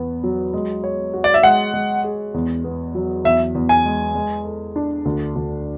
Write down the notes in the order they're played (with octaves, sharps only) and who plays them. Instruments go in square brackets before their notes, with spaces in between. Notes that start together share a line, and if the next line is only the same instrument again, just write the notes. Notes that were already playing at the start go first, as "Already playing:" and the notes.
Already playing: [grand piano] E2 B3
F#3
G#3
C#5
F#4
[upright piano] D5
E5
[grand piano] G#3 [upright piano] F#5
[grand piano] G#3
G#4
E2
B3
F#3
[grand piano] E2 [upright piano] E5
[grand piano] E2
[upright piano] G#5
[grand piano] G#3
G#3
A4
D4
D2
D2